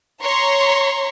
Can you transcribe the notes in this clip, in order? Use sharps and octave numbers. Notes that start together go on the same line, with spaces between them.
C#5 A#5 C6 C#6